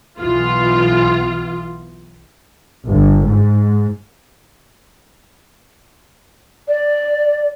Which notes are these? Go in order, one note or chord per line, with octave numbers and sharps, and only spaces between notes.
B1 E3 B3 F4
G1
G#2
D5